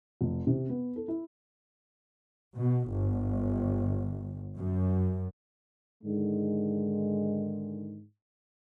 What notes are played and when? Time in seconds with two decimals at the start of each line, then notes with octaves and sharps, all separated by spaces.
0.21 F1
0.47 C3
0.69 B3
0.96 A4
1.08 E4
2.55 B2
2.89 G1
4.57 F#2
6.04 G#2 D3 D#3 G#3